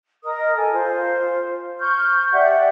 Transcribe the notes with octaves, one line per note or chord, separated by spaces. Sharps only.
A#4 D#5 D#6
A4 G#5
F4 C5
C#6 F6 G6
G4 D5 E5 F#5